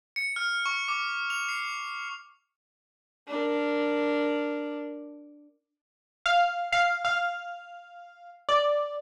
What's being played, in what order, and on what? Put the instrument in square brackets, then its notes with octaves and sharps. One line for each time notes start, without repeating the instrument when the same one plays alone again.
[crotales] C#7
F6
C#6
D6
F7
C7
[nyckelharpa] D4 A#4
[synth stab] F5
F5
F5
D5